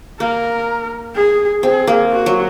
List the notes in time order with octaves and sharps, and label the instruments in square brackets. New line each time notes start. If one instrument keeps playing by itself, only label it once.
[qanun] A#3 [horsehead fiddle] A#4
[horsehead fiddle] G#4
[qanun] C4 [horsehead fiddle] G#4
[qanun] A#3
[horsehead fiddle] F#4
[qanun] F#3